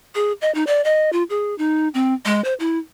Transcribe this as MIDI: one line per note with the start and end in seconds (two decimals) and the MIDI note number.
0.15 0.32 68
0.41 0.53 75
0.55 0.64 63
0.67 0.83 74
0.84 1.10 75
1.13 1.23 65
1.30 1.56 68
1.58 1.88 63
1.94 2.14 60
2.25 2.43 56
2.44 2.54 72
2.60 2.79 64